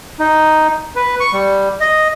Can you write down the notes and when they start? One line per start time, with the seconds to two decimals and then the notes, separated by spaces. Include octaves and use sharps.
0.19 D#4
0.96 B4
1.20 C#6
1.33 G3
1.80 D#5